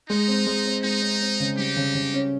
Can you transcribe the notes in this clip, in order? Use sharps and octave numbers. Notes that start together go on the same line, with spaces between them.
G#3 D#4
C4
G#3
C4
G#3 D#4
C4
C4
C#3
G3 D#4 G4
C#3
C#3
C#4